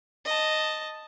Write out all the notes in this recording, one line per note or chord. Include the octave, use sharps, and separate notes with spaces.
D#5 A5